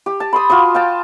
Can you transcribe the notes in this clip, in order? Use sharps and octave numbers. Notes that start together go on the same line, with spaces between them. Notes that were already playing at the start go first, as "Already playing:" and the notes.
G4
A5
B5 C6 D#6
F4 F#4 C6 D#6
F5 G5 A5